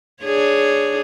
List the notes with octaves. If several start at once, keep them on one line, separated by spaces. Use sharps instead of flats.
D4 G#4 C#5